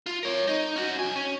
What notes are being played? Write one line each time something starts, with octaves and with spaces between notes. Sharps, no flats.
F4
A#4 C#5
D#4
C#4 F#4
D3 G#5
C#4